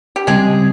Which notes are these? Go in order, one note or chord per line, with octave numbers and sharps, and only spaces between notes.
G4
C#3 G3 G#3 C4 G#4